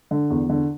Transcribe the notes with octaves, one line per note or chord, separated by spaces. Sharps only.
D3
E2
D3